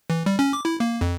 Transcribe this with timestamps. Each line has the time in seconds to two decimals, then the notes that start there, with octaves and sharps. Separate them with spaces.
0.10 E3
0.26 G3
0.39 C#4
0.53 D6
0.65 E4
0.80 A#3
1.01 F2